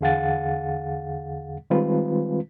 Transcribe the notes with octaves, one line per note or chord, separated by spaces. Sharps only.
E2 D3 G#4 F5 F#5 A6
D#3 G3 G#3 C4 F4 B4